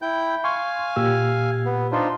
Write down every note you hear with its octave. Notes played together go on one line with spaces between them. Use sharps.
E4 G5 G6
F5 G#5 C6 C#6
A#2 G4 E6
B3
D4 D#4 F4 C5 C6